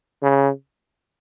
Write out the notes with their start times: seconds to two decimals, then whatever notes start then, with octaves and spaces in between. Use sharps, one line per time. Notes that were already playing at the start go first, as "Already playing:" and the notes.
0.23 C#3